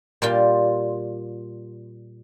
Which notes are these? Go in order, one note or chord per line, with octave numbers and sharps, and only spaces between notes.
A#2 G3 F4